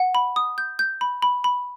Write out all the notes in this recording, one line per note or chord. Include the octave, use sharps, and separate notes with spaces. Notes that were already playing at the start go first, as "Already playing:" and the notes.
Already playing: F#5
B5
D#6
G6
G6
B5
B5
B5